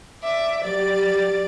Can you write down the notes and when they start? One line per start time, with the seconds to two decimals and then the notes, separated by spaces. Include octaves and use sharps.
0.23 D5 E5 D6
0.63 F#3 G4 D5 A6